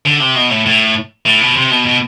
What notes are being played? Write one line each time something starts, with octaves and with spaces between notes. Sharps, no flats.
D3
C3
B2
A2
A2
A2
B2
C3
B2
B2